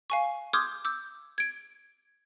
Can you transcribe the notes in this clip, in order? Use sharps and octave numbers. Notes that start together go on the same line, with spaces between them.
F5 G#5 C#6
C6 D6 D#6 F6 G6 G#6
D6 E6 G6
G#6 D7